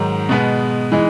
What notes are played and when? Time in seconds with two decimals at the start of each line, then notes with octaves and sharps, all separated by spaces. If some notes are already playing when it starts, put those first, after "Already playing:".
Already playing: G#2 D#3 F#3
0.29 B2 G#3 B3
0.92 E3 G#3 D#4